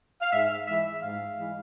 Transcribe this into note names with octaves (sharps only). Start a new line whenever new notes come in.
F5
G#2 E5
E3 G#3 E5
G#2 F5
E3 G#3